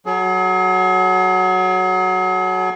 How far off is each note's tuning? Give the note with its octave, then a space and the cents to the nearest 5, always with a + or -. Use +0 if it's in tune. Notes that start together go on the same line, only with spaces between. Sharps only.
F#3 +0 G#4 +40